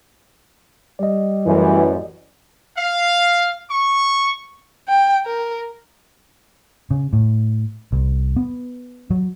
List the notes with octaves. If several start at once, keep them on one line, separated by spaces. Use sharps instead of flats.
G3 D5 D#5
A1 F#2 E3
F5
C#6
G5
A#4
C#3
A2
C2
B3
F#3